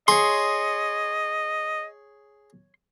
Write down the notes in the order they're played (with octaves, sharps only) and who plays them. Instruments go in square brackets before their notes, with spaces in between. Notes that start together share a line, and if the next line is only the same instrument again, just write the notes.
[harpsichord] G#4 [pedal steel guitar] C#5 C6 [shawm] D#5